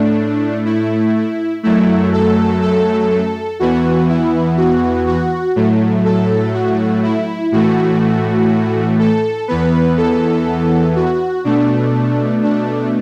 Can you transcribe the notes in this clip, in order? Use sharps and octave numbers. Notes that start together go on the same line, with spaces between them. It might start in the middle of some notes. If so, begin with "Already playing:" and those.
Already playing: A2 A3 D4
E4
F#2 F#3 A3 E4
A4
A4
A4
E2 E3 B3 F#4
E4
F#4
F#4
A2 F#3 A3
A4
F#4
E4
A2 E3 A3 F#4
A4
E2 E3 B3 B4
A4
F#4
B2 A3 D4
D4